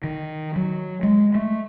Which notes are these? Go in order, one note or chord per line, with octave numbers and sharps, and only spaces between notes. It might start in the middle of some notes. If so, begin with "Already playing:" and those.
D#3
F#3
G#3
A3